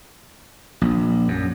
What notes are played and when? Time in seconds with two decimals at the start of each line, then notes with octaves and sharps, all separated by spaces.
0.81 A#1
1.28 F#2